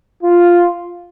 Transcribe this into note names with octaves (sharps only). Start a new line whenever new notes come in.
F4